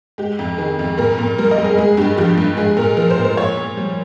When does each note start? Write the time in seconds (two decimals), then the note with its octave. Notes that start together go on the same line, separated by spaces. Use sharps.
0.18 G#3 G4
0.39 F2
0.58 D#3 G#4
0.79 F2
0.98 A#2 A#4
1.19 A#2
1.38 G3 A#4
1.51 D#5
1.58 G3
1.64 G#4
1.77 G#3 G#4
1.97 G2 G4
2.18 F3 G4
2.38 G2
2.57 G#3 G#4
2.77 A#2 A#4
2.97 F3 A#4
3.10 C5
3.18 A#2
3.25 C5
3.37 A#2 C#5
3.57 A#2
3.77 G3